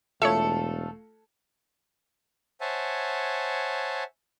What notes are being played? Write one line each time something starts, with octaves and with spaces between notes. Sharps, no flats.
E1 A3 F4 A4 C#5 E5 C#7
C5 C#5 E5 F#5 G#5 A5